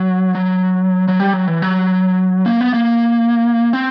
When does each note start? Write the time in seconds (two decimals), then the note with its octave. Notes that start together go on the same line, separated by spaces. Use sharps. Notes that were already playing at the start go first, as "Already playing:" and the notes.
Already playing: F#3
0.35 F#3
1.08 F#3
1.20 G3
1.33 F#3
1.47 E3
1.62 F#3
2.46 A#3
2.61 B3
2.74 A#3
3.73 C4